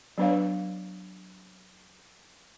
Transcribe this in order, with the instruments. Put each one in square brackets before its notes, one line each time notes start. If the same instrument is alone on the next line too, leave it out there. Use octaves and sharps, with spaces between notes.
[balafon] F#3 B3 D4 B4 C#5 F5